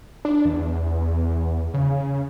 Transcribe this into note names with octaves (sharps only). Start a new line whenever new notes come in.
D4
E2
C#3